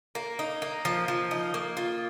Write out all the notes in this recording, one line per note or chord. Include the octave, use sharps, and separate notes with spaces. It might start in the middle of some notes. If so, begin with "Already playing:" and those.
A#3
D#4
A#3
F3
F3
D#4
A#3
F4